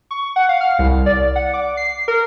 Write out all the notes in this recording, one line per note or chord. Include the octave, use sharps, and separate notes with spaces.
C#6
F#5
F5
F6
C2
D5
F#5
D6
C7
A#4